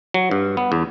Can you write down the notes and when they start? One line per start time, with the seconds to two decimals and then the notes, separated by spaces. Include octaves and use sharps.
0.14 F#3
0.31 G2
0.57 B3
0.72 E2